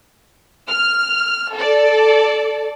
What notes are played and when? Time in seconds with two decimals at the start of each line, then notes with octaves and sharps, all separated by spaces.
0.68 F6
1.54 A4 D5